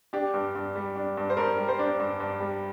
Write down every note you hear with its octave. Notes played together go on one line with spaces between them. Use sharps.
D4 G4
G2
G2
G3
D4
G2
C5
G2 A#4
G3
C5
D4
G2
G2
G3